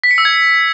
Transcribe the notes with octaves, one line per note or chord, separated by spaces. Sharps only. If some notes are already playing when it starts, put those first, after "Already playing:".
B6
C#7
E6
G#6